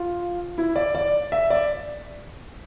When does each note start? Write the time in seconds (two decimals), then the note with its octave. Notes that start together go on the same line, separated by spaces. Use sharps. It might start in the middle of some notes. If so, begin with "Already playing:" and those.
Already playing: F4
0.58 E4
0.76 D5
0.95 D5
1.32 E5
1.50 D5